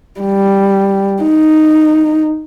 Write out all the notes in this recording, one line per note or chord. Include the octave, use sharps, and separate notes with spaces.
G3
D#4